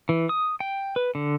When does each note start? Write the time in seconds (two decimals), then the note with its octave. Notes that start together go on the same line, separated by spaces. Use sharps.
0.09 E3
0.29 D#6
0.60 G5
0.96 B4
1.15 D3